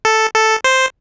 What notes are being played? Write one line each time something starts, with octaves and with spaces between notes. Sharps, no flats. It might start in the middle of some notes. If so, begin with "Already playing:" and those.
A4
A4
C5